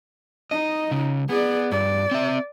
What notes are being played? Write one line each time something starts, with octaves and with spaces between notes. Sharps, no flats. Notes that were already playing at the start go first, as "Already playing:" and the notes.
D#4 D#5
C#2 C#3
B3 G#4 D5
G2 D5
C4 E5